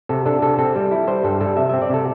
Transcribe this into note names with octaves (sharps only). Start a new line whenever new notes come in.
C3 A4
D4 A4
C3 A4
C4 A4
G3
E4
G3 C5
G2 A4
G3 A4
C3 E5
C4 E5
D5
C3 A4